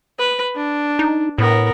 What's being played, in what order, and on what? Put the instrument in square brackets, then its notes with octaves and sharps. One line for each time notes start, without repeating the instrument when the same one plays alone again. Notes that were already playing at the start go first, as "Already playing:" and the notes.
[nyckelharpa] B4
D4
[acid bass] D#4
[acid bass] A2 [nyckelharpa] B3 A#4